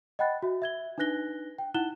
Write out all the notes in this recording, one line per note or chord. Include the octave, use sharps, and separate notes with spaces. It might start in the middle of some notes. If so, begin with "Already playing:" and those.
D#5 F#5 G5 B5 F#6 A6
F#4 E5
E5 G#6 G7
D4 D#4 B4 F#6 A#6 G7
G5
D#4 E4 F#5 F#6 E7 G7